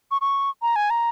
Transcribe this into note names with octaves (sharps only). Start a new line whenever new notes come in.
C#6
C#6
A#5
G#5
A#5